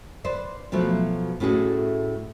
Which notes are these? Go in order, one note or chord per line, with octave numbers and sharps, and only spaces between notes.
B4 C5 D5
B2 F3 F#3 A3 B3
A2 A3 C#4 F#4 G#4